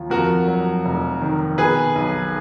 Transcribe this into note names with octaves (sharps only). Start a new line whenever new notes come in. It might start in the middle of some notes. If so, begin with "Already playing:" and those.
Already playing: D#2 F3
F2 F#4 A#4
F#3
F1
D#3
B2 G#4 B4
B1